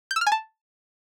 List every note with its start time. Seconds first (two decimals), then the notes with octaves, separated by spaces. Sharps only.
0.11 G6
0.16 E6
0.21 F6
0.27 G#5
0.32 A5